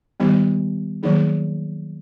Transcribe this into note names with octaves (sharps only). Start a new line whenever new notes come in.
D#3 G3 B3 D#4 G4
D#3 F#3 A#3 D#4 G#4